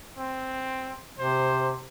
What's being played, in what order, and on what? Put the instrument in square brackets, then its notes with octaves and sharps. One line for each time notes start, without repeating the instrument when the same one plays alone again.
[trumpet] C4
[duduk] C3 [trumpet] C5